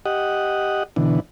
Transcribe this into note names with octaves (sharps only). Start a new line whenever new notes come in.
G4 D#5 F#5
B2 D3 E3